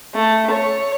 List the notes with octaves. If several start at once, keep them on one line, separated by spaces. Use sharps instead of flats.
A3
C#5